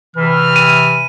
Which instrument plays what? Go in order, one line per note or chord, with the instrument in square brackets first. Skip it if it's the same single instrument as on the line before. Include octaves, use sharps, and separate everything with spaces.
[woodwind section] C3 E3 [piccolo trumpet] F6
[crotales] D#7